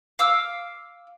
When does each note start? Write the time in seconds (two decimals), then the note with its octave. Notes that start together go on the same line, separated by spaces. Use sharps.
0.19 F5 D6 E6 F6